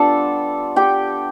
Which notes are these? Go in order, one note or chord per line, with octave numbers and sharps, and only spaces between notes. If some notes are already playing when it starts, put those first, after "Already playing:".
Already playing: G3 B3 D4 F4 A4 A5
G4 G5